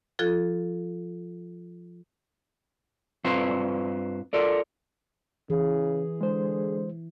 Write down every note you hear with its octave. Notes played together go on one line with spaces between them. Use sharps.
F3 F4 A4 F#6 G#6
G2 C4 F4 B4 C5 F5
F4 A4 A#4 D5
C#3 E3 G#4
D3 G#3 C5